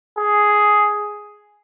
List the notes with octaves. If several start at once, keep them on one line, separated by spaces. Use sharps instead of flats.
G#4